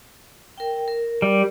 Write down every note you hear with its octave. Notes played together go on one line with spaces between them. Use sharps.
A#4 G5
A#4
G3